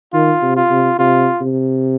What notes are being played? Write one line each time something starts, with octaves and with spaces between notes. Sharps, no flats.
D#3 F4
C3
F4
C3
C3 F4
C3